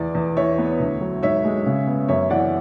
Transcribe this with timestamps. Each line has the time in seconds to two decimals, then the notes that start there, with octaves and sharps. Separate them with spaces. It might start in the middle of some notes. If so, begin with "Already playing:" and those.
Already playing: E2 D5
0.15 E2
0.37 E3 C#5 E5
0.58 B3
0.80 D2
1.01 F#3
1.23 G#2 C#5 E5
1.45 G#3
1.66 C#3
1.87 B3
2.08 F#2 C#5 E5
2.30 E3 D5 F#5